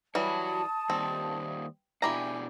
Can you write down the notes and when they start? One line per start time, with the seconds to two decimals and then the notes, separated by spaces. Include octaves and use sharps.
0.15 E3 G3 F#4 C#5 A5 D#6
0.90 D#2 G3 C4
2.02 B2 D4 E4 G4 G#5 A#5